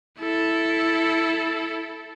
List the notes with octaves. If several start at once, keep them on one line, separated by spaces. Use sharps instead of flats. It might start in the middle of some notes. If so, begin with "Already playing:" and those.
E4 A4